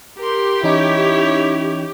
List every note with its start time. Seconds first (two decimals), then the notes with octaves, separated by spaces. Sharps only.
0.19 G4 A#4 C6
0.63 E3 C#4 D#4 E4 C#5